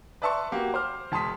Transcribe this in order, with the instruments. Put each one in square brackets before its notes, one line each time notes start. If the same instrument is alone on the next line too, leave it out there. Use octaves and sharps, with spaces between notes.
[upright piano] B4 D5 E5 A5 C6 C#6
A#3 F#4 G4
C5 D6 F6
E1 A5 C6 D#6 B6